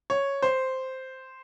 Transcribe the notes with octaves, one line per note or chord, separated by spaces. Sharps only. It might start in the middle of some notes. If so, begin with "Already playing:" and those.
C#5
C5